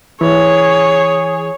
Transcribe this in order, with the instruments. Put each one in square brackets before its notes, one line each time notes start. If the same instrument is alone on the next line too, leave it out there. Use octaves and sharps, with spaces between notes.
[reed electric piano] E3 [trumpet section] G#4 [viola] C#5